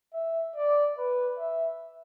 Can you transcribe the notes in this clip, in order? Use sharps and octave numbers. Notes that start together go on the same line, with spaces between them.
E5
D5
B4
E5